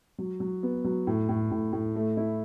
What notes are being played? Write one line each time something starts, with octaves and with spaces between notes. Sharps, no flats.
F#3
F#3
B3
F#3
A2
A2
A2
A2
A3
E4